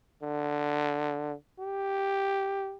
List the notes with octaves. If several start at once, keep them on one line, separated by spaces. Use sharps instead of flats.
D3
G4